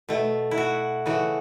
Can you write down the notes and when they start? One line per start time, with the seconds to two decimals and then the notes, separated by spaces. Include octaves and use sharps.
0.09 B2 A3
0.51 E4
0.57 F#4
1.06 C#3 E3 A3 F#4